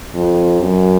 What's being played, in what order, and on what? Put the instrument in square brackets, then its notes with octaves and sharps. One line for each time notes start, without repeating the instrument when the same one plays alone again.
[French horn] F2
F#2